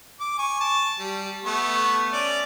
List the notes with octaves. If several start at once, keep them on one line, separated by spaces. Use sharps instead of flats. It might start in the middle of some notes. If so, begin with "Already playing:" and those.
D6
G#5 C#6
A5
G3
A3 B3 C#6
C#4 D5